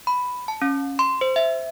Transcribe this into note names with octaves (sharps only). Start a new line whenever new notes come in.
B5
A5
C#4
C6
C5
E5